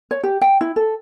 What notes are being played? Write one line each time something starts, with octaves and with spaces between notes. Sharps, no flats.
C#5
G4
G5
E4
A4